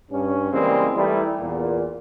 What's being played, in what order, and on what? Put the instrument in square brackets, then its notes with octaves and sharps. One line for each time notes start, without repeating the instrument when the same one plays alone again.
[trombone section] G2 C#4
C#3 E3 G3 G#3 A#3 C4
E3 G3 A3 D#4 E4
E2 A#2